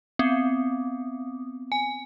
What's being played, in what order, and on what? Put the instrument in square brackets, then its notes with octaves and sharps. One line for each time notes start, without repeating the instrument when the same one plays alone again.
[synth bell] B3 C4
G#5